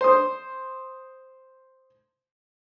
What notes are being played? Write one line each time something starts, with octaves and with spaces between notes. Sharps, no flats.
C5 C6 D#6